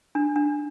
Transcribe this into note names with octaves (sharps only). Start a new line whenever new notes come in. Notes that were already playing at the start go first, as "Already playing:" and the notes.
D4
D4